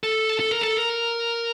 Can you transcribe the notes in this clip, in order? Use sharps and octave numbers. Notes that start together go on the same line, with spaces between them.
A4
A4
A#4
A4
A#4